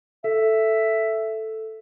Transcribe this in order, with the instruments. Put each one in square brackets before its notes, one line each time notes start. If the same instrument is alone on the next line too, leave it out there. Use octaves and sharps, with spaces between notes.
[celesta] A4 [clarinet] E5